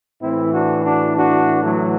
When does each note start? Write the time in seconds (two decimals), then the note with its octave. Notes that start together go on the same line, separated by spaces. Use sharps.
0.22 A2 E3 C4 E4
0.54 D4 F#4
0.85 D4 F#4
1.16 D4 F#4
1.64 F#3 A3